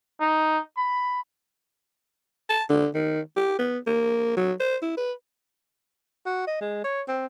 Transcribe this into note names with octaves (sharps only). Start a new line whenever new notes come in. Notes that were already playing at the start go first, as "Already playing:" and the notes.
D#4
B5
A5
D3
D#3
G4
B3
A#3
F#3
C5
E4
B4
F#4
D#5
G#3
C#5
C4